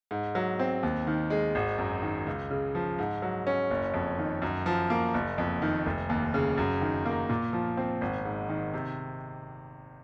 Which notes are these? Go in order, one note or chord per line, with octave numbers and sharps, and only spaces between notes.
G#2
F#3
C4
D#2
D#3
G#3
G#1
F#2
D#3
C#2
C#3
F3
G#2
F#3
C#4
F#1
F2
D#3
F#2
F3
A#3
F#1
F2
D#3
F1
D#2
C#3
F#2
D#3
A#3
A#2
F3
C4
G#1
G#2
D#3
C3